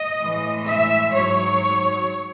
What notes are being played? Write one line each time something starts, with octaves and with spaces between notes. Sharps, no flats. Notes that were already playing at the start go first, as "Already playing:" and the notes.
Already playing: D#5
A2 E3 G#3
E5
G#2 F#3 C#5